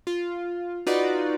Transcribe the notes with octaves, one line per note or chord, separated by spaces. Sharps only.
F4
D#4 F4 F#4 B4 D5